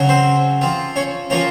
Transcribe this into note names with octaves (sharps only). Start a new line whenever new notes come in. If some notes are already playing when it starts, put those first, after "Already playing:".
Already playing: C#3 F#3 C#4
C4 C5
F3 C4 F4
C#4 C#5
F3 A#3 C#4 F4 C#5